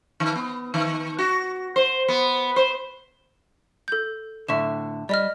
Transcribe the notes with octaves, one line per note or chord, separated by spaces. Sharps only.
D#3
B3
D#3
F#4
C5
B3
C5
A4 G6
A2 D3 E5 C#6 E7
G3 D5 D#5 F6